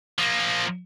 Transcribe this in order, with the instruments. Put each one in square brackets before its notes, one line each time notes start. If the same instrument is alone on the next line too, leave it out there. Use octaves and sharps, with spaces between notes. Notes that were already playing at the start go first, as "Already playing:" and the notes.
[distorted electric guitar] F3 A#3